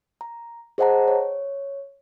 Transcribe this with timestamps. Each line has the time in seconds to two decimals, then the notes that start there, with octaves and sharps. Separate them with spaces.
0.21 A#5
0.78 G#4 C5 D#5 F#5 A5 A#5
1.08 C#5